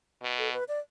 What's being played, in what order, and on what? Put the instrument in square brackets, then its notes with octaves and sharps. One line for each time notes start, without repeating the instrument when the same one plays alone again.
[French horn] B2
[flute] A4
B4
D5